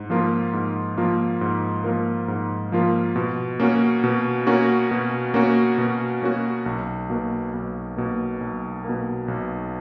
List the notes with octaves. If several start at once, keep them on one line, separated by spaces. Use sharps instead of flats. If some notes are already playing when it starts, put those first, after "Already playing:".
Already playing: G#2
F3 A#3 F4 A#4
G#2
F3 A#3 F4 A#4
G#2
F3 A#3 F4 A#4
G#2
F3 A#3 F4 A#4
B2
A#3 C#4 F#4
B2
A#3 C#4 F#4
B2
A#3 C#4 F#4
B2
A#3 C#4 F#4
B1
B2 A#3
B1
B2 A#3
B1
B2 A#3
B1